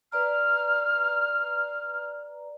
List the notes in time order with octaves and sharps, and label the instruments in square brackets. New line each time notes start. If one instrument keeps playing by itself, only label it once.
[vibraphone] B4 D5 A#5 [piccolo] F6